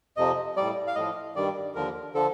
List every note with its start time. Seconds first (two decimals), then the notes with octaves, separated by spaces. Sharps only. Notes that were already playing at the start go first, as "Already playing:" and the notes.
0.17 F2 C3 F3 D#5
0.56 A2 G3 D5
0.87 F5
0.95 A2 F3 D#5
1.36 G2 D#3 G3 D5
1.75 D#2 D3 F3 A#4
2.14 D3 F3 A4